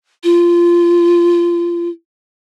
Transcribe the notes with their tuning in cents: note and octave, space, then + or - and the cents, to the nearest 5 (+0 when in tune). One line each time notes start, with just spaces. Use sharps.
F4 -20